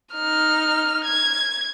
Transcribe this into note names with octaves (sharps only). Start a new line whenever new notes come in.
D#4 F6
G#6